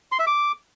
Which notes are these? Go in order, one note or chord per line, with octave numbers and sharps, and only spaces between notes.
C6
E5
D6